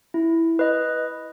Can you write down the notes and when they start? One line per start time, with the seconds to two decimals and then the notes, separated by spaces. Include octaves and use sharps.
0.14 E4
0.59 B4 D#5